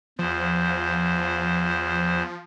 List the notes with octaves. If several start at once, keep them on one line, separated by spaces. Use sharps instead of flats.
E2 F3 C5